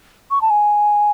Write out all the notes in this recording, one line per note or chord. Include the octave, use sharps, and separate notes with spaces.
C#6
A5
G#5